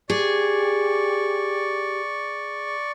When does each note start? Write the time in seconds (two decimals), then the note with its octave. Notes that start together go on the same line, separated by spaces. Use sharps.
0.10 G4 G#4 D5 C#6